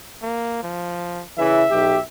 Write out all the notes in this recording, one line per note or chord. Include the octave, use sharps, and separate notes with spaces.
A#3
F3
C#3 E3 E5
B1 G4